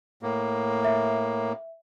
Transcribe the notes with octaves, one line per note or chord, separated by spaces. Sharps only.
A2 A#3
E5